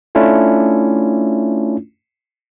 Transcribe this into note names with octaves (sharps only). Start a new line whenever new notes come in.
A3 C#4 D4 E4 F4